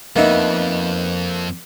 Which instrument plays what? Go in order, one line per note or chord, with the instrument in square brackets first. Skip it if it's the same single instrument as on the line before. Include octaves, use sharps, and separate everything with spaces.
[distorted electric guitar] F2 [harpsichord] A#3 E5 [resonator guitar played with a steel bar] B3 D#4